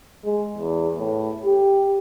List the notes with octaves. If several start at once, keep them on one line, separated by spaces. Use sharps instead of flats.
G#3
E2
A2
G4